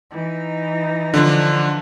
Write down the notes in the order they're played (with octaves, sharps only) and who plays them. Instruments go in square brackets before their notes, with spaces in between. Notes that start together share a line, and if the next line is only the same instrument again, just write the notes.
[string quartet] E3 D#4
[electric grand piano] D3 F3 D4